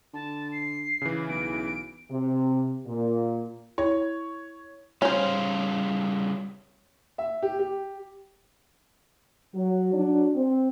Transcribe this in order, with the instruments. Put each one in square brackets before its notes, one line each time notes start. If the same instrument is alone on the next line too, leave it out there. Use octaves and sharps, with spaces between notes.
[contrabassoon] D3 [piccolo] A5
[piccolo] C7
[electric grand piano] C#3 E3
[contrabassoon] B1 [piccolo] D7
[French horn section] C3
A#2
[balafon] E4 [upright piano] C#5
[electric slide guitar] C#3 G3 F5 [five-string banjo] C#4 C5
[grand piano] E5
G4
G4
[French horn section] F#3
F#3 D4
C4